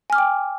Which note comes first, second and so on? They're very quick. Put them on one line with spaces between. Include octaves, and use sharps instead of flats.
G#5 F6 D6 G5